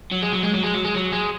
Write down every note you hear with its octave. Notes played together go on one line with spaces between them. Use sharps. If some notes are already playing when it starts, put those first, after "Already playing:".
F#3
G#3
F#3
G#3
F#3
G#3
F#3
G#3
F#3
G#3